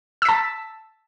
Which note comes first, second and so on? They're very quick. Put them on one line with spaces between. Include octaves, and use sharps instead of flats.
E6 B6 A5